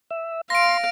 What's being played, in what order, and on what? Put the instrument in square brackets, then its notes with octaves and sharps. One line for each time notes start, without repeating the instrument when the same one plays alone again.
[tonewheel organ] E5
[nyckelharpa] F5 [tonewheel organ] C6 [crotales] A#6 D7